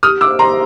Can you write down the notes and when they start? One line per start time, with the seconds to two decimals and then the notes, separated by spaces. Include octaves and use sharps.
0.03 G4 D#6 F6
0.21 D6 E6
0.27 C5
0.39 A#5 C6